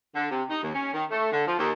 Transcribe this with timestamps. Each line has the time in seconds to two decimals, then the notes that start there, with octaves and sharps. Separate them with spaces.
0.15 D3
0.30 C3
0.49 D#4
0.62 D#2
0.74 C#4
0.93 D#3
1.10 A3
1.32 D3
1.46 F3
1.58 D#2